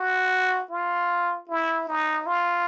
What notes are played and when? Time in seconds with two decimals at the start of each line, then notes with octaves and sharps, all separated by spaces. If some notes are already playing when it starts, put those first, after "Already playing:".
Already playing: F#4
0.71 F4
1.49 E4
1.88 D#4
2.26 F4